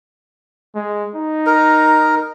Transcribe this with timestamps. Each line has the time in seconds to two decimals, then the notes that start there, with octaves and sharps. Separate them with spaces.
0.75 G#3
1.16 D#4
1.46 A#4